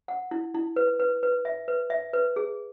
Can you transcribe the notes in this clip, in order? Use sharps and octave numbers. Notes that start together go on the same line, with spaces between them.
F#5
E4
E4
B4
B4
B4
E5
B4
E5
B4
G#4